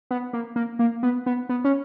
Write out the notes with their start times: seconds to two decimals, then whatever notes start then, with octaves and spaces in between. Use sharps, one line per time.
0.11 B3
0.33 A#3
0.56 A#3
0.79 A#3
1.03 B3
1.26 B3
1.49 B3
1.64 C#4